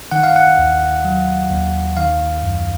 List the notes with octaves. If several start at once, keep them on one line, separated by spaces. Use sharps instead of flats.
D#3 F#5
F5
F#5
D#2
F#3
D#2
D#3 F5
F#2